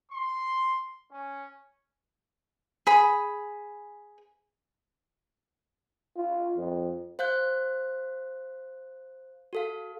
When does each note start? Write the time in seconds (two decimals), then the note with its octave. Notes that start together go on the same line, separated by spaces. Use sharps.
0.11 C6
1.11 C#4
2.87 G#4 B5
6.16 F4
6.58 F2
7.19 C5 F5 F#6 G6
9.53 F#4 A4 F5